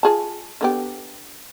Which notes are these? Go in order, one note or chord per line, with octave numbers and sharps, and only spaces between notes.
F4 G#4 A5
D3 B3 G4